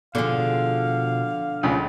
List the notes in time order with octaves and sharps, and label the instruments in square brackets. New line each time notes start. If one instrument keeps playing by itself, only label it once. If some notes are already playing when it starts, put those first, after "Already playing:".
[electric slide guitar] B2 D#3 F3 [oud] D3 G#4 [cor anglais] F5
[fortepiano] C#2 C#3 C#4 [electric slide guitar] F3